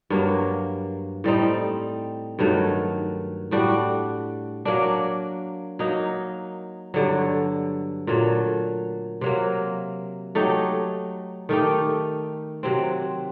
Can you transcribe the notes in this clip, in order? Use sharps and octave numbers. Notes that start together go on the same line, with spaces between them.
G2 F#3 A#3
A2 G3 C4 D#4
G2 D#3 F#3 A3
A2 G3 D4 F#4
F#3 A#3 D4
F#3 A#3 D#4
G2 D3 F#3
A#2 F#3 A3
C3 F#3 A#3
F#3 A3 D#4 G4
D#3 A3 D#4 G4
C3 F#3 C4